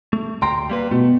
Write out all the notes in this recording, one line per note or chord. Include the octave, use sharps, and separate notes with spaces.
A3
D2 G5 A#5 C6
G3 A#3 B4
B2 A3